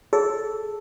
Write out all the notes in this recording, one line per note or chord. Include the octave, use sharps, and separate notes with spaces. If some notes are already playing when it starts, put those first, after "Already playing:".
G#4 A4